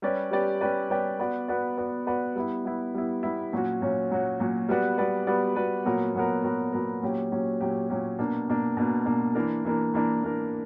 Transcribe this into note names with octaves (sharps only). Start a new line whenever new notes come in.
G3 C#4 G4 B4 D5
G3 C#4 G4 B4 D5
G3 C#4 G4 B4 D5
G3 C#4 G4 B4 D5
B3 F#4 B4 D5
B3 F#4 B4 D5
B3 F#4 B4 D5
B3 F#4 B4 D5
G3 B3 E4
G3 B3 E4
G3 B3 E4
G3 B3 E4
A#2 F#3 C#4 F#4
A#2 F#3 C#4 F#4
A#2 F#3 C#4 F#4
A#2 F#3 C#4 F#4
G3 B3 F#4 B4 D5
G3 B3 F#4 B4 D5
G3 B3 F#4 B4 D5
G3 B3 F#4 B4 D5
A#2 F#3 B3 F#4 A#4
A#2 F#3 B3 F#4 A#4
A#2 F#3 B3 F#4 A#4
A#2 F#3 B3 F#4 A#4
A#2 F#3 C#4 G4
A#2 F#3 C#4 G4
A#2 F#3 C#4 G4
A#2 F#3 C#4 G4
B2 A#3 D4
B2 A#3 D4
B2 A#3 D4
B2 A#3 D4
E3 A#3 D4 A#4
E3 A#3 D4 A#4
E3 A#3 D4 A#4
E3 A#3 D4 A#4